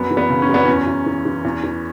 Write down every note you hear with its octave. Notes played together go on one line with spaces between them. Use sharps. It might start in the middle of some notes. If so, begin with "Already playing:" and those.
Already playing: F#2 B3
E3
B3
C#3
C#4
F#2
B3
E2 C#4
E2
E3
E3
E2
E3